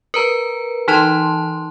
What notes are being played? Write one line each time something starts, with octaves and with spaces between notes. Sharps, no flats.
A#4 B4 A#5
E3 D#4 A5 C6